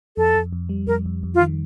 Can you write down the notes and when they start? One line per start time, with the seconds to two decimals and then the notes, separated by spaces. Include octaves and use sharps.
0.17 F2 A4
0.35 F2
0.53 F2
0.69 G3
0.87 F2 A#4
1.06 F2
1.23 F2
1.34 F4
1.40 D#3